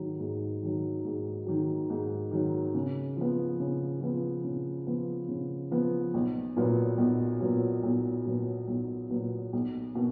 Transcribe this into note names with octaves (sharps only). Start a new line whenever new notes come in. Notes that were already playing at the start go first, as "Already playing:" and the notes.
Already playing: G#2 D#3 F#3
G#2
D#3 F#3
G#2
D#3 F#3
G#2
D#3 F#3
C#3
F3 B3
C#3
F3 B3
C#3
F3 B3
C#3
F3 B3
B1
A#2 F#3 B3
B1
A#2 F#3 B3
B1
A#2 F#3 B3
B1
A#2 F#3 B3
B1
B2 A#3